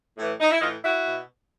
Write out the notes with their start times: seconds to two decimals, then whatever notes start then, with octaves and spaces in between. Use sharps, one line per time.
0.18 A2 E3
0.40 D#4
0.51 E4
0.60 A2 E3 D#4 F4
0.82 E4 F#4
1.05 B2